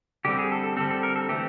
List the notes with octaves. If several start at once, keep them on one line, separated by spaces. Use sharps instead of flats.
D3 G3 C4 G4
G#4
A4
A4
D3 G3 C4 A4
A4
A#4
A4
E3 A3 C4 G4